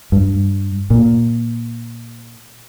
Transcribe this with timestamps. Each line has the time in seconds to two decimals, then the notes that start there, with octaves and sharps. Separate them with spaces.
0.12 G2
0.90 A#2